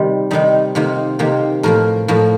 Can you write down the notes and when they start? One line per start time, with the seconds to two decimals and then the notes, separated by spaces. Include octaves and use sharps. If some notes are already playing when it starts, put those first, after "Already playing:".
Already playing: C3 D#3 G3 G4
0.31 C3 D#3 G3 D#4
0.75 C3 D#3 A#3 F4
1.19 C3 D#3 A#3 G4
1.63 A2 F3 A#3 A#4
2.08 A2 F3 A#3